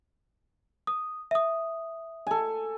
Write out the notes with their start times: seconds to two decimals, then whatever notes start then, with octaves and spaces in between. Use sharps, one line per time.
0.87 D#6
1.31 E5 D#6
2.27 A4 G#5